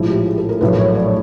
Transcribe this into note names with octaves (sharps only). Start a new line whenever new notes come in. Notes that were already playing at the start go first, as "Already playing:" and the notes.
Already playing: A#1 A2 F3 G#3 E4
G4
G#4
A4
A#4
A#1 A2 F#3 A3 B4
C#5
D5